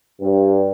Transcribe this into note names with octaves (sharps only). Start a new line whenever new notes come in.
G2